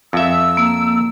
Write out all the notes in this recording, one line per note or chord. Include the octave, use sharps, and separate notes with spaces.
F2 E5 E6
A#3